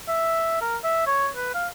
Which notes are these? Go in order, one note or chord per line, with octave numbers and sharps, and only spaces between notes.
E5
A#4
E5
C#5
B4
F5